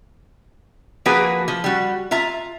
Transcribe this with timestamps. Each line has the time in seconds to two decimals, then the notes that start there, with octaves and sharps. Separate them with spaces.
1.06 F3 A#3 F#4 G#4 B4
1.48 F3
1.64 G3 F#4
2.11 F4 E5 A#5